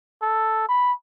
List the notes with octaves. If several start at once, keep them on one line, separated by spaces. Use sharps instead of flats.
A4
B5